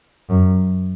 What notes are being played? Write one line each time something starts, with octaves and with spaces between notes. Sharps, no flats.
F#2